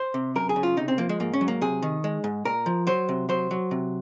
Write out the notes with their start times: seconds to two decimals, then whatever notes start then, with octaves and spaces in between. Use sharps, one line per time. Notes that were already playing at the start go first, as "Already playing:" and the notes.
Already playing: C5
0.14 C3
0.36 F#2 A#4
0.49 G#4
0.56 C#3
0.63 F4
0.77 C3 D#4
0.88 C4
0.98 F3 A#3
1.09 G#3
1.20 G#2 A#3
1.33 C#4
1.41 F#3
1.48 A#3
1.61 C3 G#4
1.82 D#3
2.04 G#3
2.24 G#2
2.45 A#2 A#4
2.66 F3
2.87 F#3 C5
3.09 C3
3.29 F#3 C5
3.51 F#3
3.71 C3